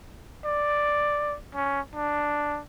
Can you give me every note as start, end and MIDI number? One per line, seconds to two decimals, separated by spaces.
0.45 1.36 74
1.55 1.81 61
1.95 2.60 62